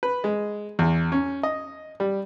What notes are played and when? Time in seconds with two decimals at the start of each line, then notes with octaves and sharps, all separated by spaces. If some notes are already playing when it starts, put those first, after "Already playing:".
0.03 B4
0.24 G#3
0.79 E2
1.12 C#4
1.43 D#5
2.00 G3